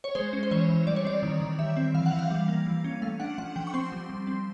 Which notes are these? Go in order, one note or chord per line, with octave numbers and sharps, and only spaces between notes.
C#5
G#3 C5
C#4
C5
E3 C#5
E3
G3 D5
C#5
C4 D5
D#3
D#3
G3 E5
C4
E3 F5
F#5
E3
F5
G3
A#3
E3
C#4
A3 F5
D4 F#5
F3 F#5
F3 G5
C#6
C4 C6
G3
G3
C4